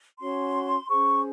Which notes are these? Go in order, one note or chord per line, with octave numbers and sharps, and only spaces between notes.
C#4 F#4 C#5 C6
C#4 G#4 C5 C#6